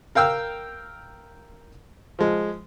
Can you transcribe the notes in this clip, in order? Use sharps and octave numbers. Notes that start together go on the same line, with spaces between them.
A#4 F5 G5 E6 F6
F3 G#3